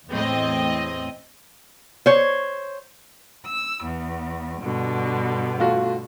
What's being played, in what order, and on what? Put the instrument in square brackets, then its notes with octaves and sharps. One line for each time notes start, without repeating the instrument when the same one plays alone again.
[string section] E2 A2 C4 D#5
[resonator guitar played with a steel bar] C5 C#5
[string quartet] E6
E2
G2 B2 D3
[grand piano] A3 F4 F#4